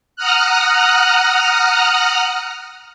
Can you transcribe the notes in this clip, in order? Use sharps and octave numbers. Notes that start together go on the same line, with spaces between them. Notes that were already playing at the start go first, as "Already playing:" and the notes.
F#5 A#5 D#6 F6 F#6